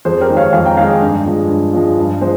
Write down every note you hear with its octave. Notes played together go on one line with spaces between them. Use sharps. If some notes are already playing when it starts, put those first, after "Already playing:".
F2 G#4 C5
G4 A#4
D#3 G#3 G5
C#5 F5
F2 F5 G#5
G5 A#5
D#3 G#3 F5 G#5
G2
F3 G#3
G2
F3 G#3
G2
F3 G#3 C5